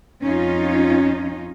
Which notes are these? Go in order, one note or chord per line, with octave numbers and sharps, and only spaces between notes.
F2 C#4 D#4 F4